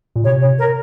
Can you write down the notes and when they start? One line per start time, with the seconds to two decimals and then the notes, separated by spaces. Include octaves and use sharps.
0.16 A#2
0.24 C3 C#5
0.41 C#5
0.59 A#4